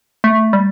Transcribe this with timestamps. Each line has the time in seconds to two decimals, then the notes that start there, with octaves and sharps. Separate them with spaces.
0.24 A3
0.53 G3